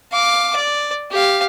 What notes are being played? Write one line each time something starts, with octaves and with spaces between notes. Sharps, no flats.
F5 D6
D5
G4 F5